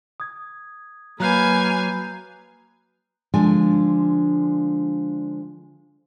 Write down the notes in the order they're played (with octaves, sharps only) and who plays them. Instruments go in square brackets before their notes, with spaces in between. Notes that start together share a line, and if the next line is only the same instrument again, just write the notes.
[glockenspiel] D#6 G#6
[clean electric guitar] F#3 [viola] A#3 B4 [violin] F5 G#5 [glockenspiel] A#5 F#6 G6
[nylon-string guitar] D3 F3 G#3 D4 G#5